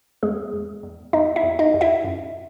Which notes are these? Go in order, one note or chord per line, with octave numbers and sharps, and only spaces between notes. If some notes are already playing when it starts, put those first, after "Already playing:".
E2 G#3 G#4
E2
E2
E2 D#4 D#5
E4 E5
E2
D#4 D#5
E2
E4 E5
F#2